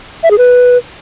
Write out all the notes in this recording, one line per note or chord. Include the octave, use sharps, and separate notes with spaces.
E5
G#4
B4